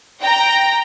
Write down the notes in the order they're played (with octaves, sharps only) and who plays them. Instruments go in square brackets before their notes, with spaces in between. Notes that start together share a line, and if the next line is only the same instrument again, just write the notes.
[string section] G5 A#5